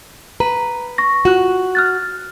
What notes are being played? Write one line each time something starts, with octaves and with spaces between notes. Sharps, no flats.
B4 A#5
C#6 A#6
F4 F#4 F#6
F6 F#6 A6